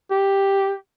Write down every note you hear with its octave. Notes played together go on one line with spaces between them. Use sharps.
G4